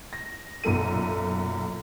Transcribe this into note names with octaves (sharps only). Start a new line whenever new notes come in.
A#6
B1 F#2 A#2 A4 D#7